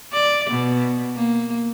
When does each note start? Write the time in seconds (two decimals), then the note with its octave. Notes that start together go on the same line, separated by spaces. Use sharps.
0.13 D5
0.50 B2
1.16 A#3